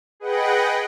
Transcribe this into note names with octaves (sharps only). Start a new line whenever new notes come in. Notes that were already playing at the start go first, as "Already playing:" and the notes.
G#4 B4 D#5 F#5 G5